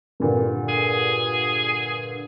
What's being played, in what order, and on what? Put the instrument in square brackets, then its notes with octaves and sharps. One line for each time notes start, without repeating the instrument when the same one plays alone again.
[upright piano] G2 A#2 D3
[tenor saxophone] G#4